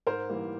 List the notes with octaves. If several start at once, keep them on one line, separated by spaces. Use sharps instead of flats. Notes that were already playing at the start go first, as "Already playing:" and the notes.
G#2 A#4 C5
E3 G3 A#3